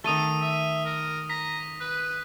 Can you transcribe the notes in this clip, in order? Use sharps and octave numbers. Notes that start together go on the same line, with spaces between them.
D#3 A3 A4 D#6 D#7 G7
E5
A#4
A#5 B6
B4